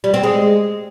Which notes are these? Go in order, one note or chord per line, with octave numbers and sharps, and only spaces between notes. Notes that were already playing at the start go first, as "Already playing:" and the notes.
G3
C4
G#3